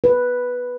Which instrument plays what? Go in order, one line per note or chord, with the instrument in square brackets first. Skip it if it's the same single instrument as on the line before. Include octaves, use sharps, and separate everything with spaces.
[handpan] B4